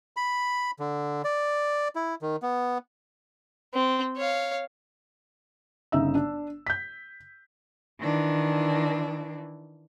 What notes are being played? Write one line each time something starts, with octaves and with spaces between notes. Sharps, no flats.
B5
D3
D5
E4
D#3
B3
C4
C#5 F5
G1 C#3 D#4 E5 E6
D4
G6 B6
D#3 E3 D4